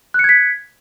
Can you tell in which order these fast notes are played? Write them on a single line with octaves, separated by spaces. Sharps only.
F#6 C#7 G#6 B6